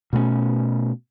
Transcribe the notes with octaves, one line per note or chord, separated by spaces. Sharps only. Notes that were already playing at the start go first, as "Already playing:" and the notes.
B2 A3 A#3 C#4